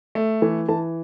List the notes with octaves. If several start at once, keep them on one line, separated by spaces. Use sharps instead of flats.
A3
E3
E3 A5